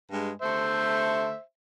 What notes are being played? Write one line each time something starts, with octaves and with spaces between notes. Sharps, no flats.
G2 G#3
D3 A3 C5 E5